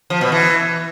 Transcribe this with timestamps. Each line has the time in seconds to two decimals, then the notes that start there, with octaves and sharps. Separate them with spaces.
0.10 F3
0.21 B2
0.32 E3